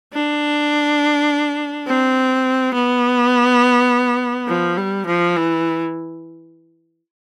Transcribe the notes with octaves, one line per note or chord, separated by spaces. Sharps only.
D4
C4
B3
F3
G3
F3
E3